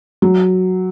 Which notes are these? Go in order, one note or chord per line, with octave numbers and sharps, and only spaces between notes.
F#3